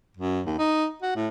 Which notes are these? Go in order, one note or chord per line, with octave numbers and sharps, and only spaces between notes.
F#2
D#2
D#4
F#4
A2